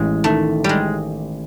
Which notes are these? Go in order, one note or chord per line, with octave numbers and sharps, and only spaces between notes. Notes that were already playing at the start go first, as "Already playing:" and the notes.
Already playing: A1 G#3
D#3 A3
G3 G#3